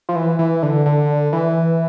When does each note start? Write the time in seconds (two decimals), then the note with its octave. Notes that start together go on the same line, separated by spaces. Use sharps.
0.09 F3
0.16 E3
0.39 E3
0.63 D3
0.86 D3
1.33 E3